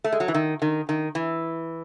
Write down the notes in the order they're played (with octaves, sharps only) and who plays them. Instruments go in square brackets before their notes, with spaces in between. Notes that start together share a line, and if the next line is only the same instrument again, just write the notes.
[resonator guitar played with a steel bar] A3
G#3
F#3
E3
D#3
D#3
D#3
E3